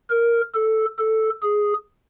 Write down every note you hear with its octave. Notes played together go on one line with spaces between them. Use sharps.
A#4
A4
A4
G#4